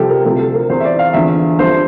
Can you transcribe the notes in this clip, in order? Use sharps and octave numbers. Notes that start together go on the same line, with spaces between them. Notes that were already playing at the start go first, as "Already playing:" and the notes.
Already playing: C2 C3 F3 G4 A4
A#4
D2 C3 F3 A4
A4
A#4
E2 E3 C5
E5
D5
F5
E2 D3 F3 E5
G2 F3 C5